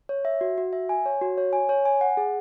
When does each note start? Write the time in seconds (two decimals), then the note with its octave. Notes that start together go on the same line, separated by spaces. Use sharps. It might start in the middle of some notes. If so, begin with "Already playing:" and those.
0.09 C#5
0.25 E5
0.41 F#4
0.58 F#4
0.73 E5
0.89 G#5
1.06 C#5
1.22 F#4
1.38 C#5
1.53 G#5
1.69 C#5
1.85 G#5
2.01 F#5
2.17 G#4